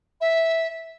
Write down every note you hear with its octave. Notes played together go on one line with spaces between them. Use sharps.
E5